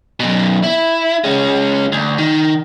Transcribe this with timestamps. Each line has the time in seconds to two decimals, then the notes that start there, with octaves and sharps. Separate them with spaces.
0.20 F#2 B2
0.63 E4
1.24 G#3 C#4
1.92 D2
2.18 D#3